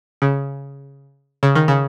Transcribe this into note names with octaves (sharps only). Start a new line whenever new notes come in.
C#3
C#3
D#3
C#3